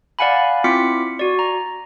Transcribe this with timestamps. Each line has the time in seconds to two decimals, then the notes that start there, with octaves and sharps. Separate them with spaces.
0.19 D5 F5 F#5 G#5 B5
0.64 C4 E4 F4 D6 B6 C#7
1.19 F#4 D5
1.39 A#5